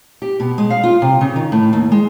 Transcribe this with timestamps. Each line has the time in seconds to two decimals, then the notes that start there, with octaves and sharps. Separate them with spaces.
0.22 G4
0.40 B2
0.58 G#3
0.70 F5
0.84 F4
1.02 C3
1.21 C#3
1.36 D#3
1.52 A2
1.73 D#2
1.92 G#3